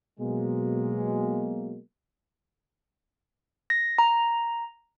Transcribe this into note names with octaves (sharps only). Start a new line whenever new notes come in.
B2 F#3 G#3 A#3
A#6
A#5